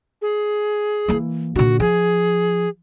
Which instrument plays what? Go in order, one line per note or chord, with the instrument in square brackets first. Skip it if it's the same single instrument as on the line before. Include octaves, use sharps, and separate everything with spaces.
[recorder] G#4
[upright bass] E3 A#3
[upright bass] A#2 D3 [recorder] F#4
[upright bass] F3 [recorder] G#4